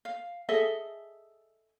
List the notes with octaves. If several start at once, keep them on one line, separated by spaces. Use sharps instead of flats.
F5
G#4 A4 D#5 E5